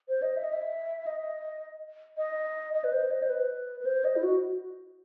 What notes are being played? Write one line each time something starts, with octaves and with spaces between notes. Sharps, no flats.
C5
D#5
E5
D#5
E5
D#5
D#5
D#5
B4
C5
D#5
C5
B4
B4
C5
D#5
E4
F#4